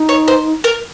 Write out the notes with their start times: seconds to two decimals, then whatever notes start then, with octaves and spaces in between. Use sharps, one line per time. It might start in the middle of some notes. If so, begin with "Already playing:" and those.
Already playing: D#4
0.09 C#5
0.28 C5
0.64 A#4